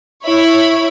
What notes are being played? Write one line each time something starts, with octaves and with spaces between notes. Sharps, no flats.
E4 C#5 B5